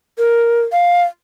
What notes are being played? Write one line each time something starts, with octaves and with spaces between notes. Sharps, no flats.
A#4
F5